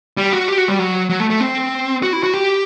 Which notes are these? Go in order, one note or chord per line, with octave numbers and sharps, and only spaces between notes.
G3
F#4
G4
F#4
G3
F#3
F#3
A3
A3
C4
F#4
E4
F#4
G4